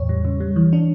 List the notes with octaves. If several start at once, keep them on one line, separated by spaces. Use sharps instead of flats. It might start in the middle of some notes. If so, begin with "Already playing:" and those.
Already playing: E2 A2 C#5
G3
C#3
G3
E3
D4